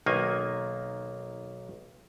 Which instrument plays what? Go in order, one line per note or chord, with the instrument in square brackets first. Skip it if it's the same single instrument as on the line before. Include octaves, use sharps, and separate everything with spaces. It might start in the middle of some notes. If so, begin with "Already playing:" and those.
[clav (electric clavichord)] B1 D#3 A#3 G#5